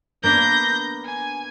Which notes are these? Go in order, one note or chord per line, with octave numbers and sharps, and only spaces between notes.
A#3 B3 D4 G6 A#6
G#5